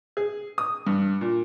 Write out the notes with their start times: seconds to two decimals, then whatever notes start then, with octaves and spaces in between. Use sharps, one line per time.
0.17 G#4
0.58 D#6
0.87 G2
1.21 A#2